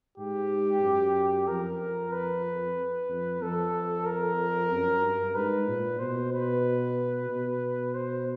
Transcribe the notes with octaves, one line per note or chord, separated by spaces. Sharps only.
G#2 G4
F#2
F2 A#4
B4
F2
F2 A4
A#4
F#2
G2
G#2 B4
A#2
B2 C5
B4
B2
C5